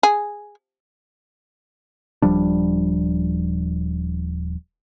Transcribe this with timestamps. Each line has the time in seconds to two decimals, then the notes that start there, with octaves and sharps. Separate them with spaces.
0.03 G#4
2.22 D#1 F3 G3 D4